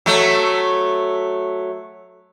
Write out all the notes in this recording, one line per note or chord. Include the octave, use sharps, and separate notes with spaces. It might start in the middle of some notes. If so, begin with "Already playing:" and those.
F#3 A3